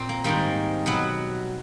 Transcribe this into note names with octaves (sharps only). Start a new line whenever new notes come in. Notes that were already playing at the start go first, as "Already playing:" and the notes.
Already playing: A#2 C4
A#3
G#2 D#3 G3 A#3
B2 F#3 B3